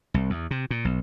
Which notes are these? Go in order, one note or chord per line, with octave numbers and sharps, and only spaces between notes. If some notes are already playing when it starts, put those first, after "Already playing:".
C2
E2
C3
A#2
B1